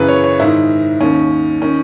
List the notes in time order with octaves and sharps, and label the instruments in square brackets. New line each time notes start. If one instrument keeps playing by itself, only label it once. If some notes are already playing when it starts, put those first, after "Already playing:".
Already playing: [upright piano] F#2 C#3 E3 B4
C#5
C#5
G#2 D#3 E4
D#2 D#3 C#4
D#3 C#4